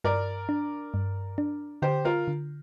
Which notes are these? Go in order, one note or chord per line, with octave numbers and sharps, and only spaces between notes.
G2 A#4 D5
D4
G2
D4
D3 G4 C5
F4 A#4
D3